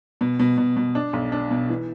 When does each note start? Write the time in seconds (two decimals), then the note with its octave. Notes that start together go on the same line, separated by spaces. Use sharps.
0.21 B2
0.39 B2
0.58 B2
0.76 B2
0.95 D4
1.13 B1
1.32 D4
1.51 B2
1.70 E3